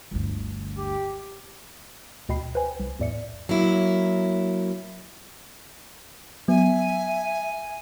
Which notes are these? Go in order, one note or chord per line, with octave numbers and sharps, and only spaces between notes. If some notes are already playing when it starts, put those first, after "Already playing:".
G1 D2
G4
D2 B2 D#5 G5 B5 C7
B4 C5 G5 G#5
C2
E2 A2 D5 E5 C#7
F#3 A#3 E4
F#3 B3 E5 G#5